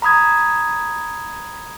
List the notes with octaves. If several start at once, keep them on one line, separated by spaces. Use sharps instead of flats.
A#5 B5 D#6 G#6